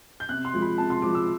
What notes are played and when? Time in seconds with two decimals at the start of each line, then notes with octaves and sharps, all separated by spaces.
0.20 G6
0.29 C3 F#6
0.45 C6
0.54 F3 G#3
0.62 B5
0.78 C3 A5
0.90 C6
1.02 F3 G#3 D6
1.15 E6